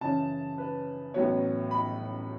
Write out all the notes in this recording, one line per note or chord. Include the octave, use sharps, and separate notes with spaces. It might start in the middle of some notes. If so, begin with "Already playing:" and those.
F#2 C#3 E3 C#4 A5
B4
A1 A2 F#3 B3 C#5
B5